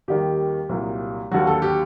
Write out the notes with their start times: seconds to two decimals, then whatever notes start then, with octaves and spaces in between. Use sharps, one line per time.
0.08 D#2 D#3 G3 G4
0.69 C2 A#2 F#3
1.31 D#2 D3 F#3 F#4
1.47 A4
1.62 G4